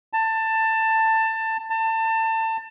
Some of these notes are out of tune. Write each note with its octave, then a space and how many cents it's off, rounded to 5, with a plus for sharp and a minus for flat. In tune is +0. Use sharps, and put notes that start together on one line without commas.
A5 +20
A5 +30